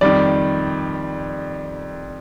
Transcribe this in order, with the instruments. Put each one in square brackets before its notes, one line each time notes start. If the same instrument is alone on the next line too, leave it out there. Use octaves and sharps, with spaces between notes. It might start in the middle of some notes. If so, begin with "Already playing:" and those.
[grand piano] F2 D#3 G3 [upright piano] D5